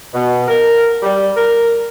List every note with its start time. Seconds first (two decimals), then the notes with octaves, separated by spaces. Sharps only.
0.14 B2
0.48 A#4
1.03 G3
1.36 A#4